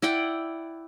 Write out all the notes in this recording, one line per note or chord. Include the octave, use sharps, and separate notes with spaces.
E4 D5 F#5 G5